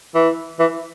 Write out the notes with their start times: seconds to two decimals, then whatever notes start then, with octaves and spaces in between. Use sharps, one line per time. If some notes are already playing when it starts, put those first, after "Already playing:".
0.15 E3
0.59 E3